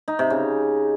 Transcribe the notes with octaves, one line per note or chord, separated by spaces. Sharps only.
D#4
C3
C#3